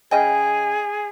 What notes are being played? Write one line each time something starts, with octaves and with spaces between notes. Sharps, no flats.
C#3 G#4 D#5 G5 G#5